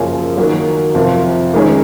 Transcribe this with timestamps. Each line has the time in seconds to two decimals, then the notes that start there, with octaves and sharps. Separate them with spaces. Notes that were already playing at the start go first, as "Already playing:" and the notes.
Already playing: F#2 C#3 F3 A#3 C#4
0.37 D#3 F#3 A#3
0.95 F2 C3 F3
1.54 D#3 G#3 C#4